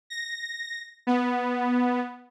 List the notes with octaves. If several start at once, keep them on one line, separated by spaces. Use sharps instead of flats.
A#6
B3